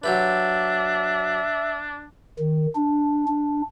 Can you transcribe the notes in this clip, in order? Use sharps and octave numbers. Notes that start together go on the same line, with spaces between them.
F#3 D4 G4 B4 E5
D#3
D4
D4